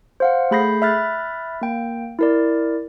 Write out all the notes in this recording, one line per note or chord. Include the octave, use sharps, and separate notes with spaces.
C5 F5 F#5
A3 G#4 B5 G6 A#6 C7
E5 B5 F6 F#6 A6
A#3 G5
E4 A#4 D5